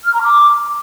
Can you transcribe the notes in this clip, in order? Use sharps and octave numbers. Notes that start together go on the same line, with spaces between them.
F6
A#5
D6